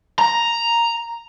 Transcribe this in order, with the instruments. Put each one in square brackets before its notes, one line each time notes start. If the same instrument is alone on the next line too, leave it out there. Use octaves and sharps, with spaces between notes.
[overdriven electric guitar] A#5